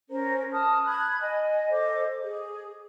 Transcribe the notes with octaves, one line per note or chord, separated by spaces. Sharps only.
C#4 A#4 C5 A#5
A5 D#6 F6
B5 F#6 G#6
D#5 G#5
A4 C5 D#5 D6
G#4